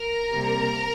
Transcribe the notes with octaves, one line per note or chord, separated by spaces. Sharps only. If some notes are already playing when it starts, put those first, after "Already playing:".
Already playing: A#4 A#5
C3 G3 A#3